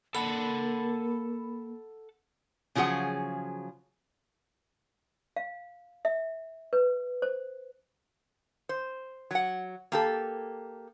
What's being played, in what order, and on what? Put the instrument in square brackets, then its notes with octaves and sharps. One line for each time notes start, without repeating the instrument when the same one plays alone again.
[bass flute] A#3 [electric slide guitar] A4 F#5 A5 [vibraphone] B5
[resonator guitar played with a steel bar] C#3 F3 F#3 G#4 F#5
[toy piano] F5
E5
B4
C5
[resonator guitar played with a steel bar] C5
F#3 F#5
A#3 G4 A4